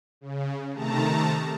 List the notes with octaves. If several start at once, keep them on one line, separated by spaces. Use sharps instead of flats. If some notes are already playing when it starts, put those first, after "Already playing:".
C#3
C3 D#3 A3 A5 A#5